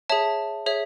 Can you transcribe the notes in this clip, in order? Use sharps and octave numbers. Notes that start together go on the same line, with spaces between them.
G#4 C#5 E5 A5
G#4 C#5 E5